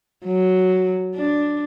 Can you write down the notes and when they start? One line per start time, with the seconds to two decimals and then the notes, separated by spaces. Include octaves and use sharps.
0.25 F#3
1.15 D4